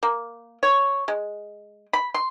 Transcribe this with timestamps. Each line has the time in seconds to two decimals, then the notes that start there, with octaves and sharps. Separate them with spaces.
0.03 A#3
0.63 C#5
1.08 G#3
1.93 B5
2.14 C6